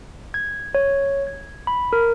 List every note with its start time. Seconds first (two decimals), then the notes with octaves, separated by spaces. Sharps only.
0.34 G#6
0.75 C#5
1.27 G#6
1.67 B5
1.93 A#4